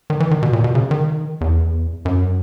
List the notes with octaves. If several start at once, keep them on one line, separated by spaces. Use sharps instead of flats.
D#3
E3
D#3
B2
A#2
B2
C#3
D#3
E2
F#2